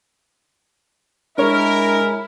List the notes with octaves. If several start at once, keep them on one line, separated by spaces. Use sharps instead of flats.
G#3 D4 E4 A#4 C#5